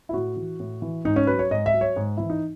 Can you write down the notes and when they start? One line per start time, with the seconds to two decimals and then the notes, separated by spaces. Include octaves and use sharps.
0.09 E4
0.13 A2 F#4
0.36 E3
0.60 A2
0.82 E3
1.05 G#2 D#4
1.16 C#4
1.27 F#3 B4
1.39 C#5
1.51 G#2 D#5
1.66 E5
1.74 F#3
1.81 C#5
1.96 G#2
2.17 E3 E4
2.30 D#4